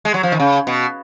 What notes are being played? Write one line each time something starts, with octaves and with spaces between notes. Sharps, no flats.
G#3
F#3
F3
D#3
C#3
B2